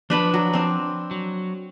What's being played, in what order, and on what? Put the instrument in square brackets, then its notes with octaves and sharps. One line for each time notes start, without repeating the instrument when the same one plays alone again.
[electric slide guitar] F3 A5 [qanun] D4 B4 B5
[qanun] F#3
C4 D4
[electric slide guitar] F#3